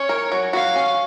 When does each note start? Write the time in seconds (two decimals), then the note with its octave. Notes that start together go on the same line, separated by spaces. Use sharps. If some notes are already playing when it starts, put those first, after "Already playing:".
Already playing: C#4 C#5
0.09 A#4
0.32 F#3
0.53 F#4 F5
0.76 C#4